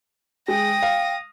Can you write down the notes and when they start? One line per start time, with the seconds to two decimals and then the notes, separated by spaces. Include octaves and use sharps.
0.48 G#3 G5 D#6 A#6
0.82 F5